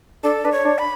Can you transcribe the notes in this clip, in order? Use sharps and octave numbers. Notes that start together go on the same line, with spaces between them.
D4 A4
D4 B4
C#5
D4
B5